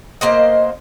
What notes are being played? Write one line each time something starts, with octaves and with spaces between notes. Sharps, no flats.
B2 A#3 C5 D#5